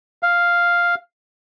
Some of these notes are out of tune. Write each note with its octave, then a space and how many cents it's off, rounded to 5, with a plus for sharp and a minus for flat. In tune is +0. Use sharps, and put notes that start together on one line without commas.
F5 +0